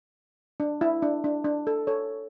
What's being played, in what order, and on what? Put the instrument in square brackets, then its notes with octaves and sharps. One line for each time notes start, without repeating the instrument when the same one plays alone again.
[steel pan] D4
E4
D4
D4
D4
A4
A4 C#5